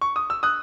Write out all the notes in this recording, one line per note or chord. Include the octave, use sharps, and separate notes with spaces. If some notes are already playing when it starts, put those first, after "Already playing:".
C#6
D#6
E6
D#6 F#6